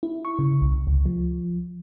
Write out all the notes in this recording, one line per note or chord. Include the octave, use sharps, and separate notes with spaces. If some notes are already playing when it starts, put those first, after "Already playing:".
E4
C#6
C#3
C2
C#2
F3